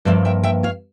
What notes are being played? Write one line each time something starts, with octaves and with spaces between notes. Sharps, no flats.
G2 F3 A#3 C5 E5
E5 G5
E5 G5
C#5 F5